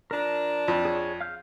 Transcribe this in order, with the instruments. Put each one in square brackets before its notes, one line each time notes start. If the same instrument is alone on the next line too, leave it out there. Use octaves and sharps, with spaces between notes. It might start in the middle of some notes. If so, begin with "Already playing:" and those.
[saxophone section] F3 D4 [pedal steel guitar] A#4 A#5
[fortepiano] F2
[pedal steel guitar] G#4 C#5
F5 F6 G6